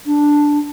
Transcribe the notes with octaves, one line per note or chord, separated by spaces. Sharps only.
D4